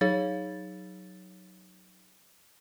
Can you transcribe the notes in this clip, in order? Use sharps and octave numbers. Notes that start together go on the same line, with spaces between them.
F#3 D#4 G#4 C#5 F5 A6